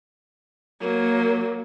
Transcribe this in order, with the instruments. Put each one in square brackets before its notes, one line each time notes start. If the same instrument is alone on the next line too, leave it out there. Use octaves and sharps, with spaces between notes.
[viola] F#3 A#3